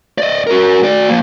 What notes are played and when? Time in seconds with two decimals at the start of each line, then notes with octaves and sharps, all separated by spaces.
0.18 D5 D#5
0.47 F#4 A#4
0.83 F#4 D5
1.09 F3 A#3